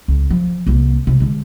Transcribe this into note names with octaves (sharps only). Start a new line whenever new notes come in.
C#2
F3
C2 A#3
C3 G#3
D3 G#3